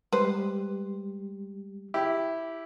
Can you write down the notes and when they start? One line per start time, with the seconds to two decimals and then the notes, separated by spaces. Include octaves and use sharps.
0.13 G3 G#3 G4 B4 C5
1.94 E4 G4